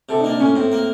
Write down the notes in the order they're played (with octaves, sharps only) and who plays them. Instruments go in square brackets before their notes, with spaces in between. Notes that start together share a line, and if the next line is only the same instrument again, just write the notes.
[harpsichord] C3 [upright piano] A4
[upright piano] D#4
[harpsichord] A#3
[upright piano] D4
[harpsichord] A2 [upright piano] C#4
[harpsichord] A2 [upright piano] C4
[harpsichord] A#3